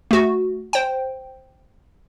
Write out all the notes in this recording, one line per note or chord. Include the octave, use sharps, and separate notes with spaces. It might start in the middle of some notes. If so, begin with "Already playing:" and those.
A3 F#4
C5 G5